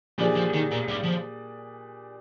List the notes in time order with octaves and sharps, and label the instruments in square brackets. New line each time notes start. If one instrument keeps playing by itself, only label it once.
[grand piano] A#2 G3 D4 G#4 [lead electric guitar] F3
[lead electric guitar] F3
D#3
A#2
G2
F3